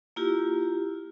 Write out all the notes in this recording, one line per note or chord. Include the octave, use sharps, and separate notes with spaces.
A#3 E4 F4 G4